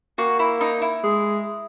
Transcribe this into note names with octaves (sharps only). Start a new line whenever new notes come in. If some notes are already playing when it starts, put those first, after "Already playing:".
A#3 F#4
E4
D#4
E4
G#3